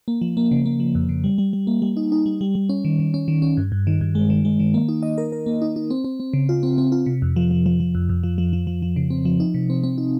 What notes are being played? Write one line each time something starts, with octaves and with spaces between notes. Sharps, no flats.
A#3
F3
A#3
C#3
A#3
F3
F2
C#3
G3
G3
G3
A#3
G3
D#4
D#4
G3
G3
G3
C#4
D#3
D#3
C#4
D#3
C#4
G2
G2
D#3
G2
G#3
D#3
G#3
D#3
A#3
D#4
D#5
A#4
A#4
A#3
D#4
D#4
C4
C4
C4
C#3
F4
C4
C4
F4
C3
F2
F3
F3
F3
F3
F2
F2
F3
F3
F3
F3
F3
C#3
C4
F3
D#4
C3
C4
C4
D#4